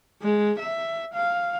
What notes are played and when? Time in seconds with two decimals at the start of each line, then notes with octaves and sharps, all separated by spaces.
0.22 G#3
0.59 E5
1.14 F5